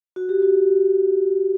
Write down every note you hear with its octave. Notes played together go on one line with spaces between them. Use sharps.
F#4
G4
F#4